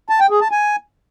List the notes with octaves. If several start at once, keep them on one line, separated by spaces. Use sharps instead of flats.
A5
G5
G#4
A5
G#5